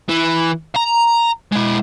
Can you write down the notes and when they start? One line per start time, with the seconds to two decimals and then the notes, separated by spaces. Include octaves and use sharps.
0.09 E3
0.76 A#5
1.52 G#3 E4